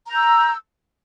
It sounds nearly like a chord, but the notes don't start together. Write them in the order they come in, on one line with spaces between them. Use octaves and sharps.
A#5 G6 E6